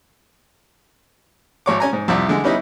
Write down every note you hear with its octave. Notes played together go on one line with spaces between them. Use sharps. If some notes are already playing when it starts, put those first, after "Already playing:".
G#1 C#5 D6
C#4 G#5 A#5
G#2
C2 F2 D5 E5
D3 G#3
G3 B3 C#4 D#4 E4